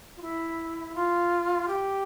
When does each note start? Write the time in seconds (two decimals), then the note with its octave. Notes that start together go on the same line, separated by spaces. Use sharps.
0.17 F4
0.22 E4
0.95 F4
1.68 G4